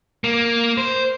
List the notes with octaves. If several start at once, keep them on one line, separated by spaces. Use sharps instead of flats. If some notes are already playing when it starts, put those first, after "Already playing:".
A#3
C5